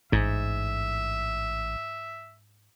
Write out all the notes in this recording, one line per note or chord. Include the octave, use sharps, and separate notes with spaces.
A1 G#2 E5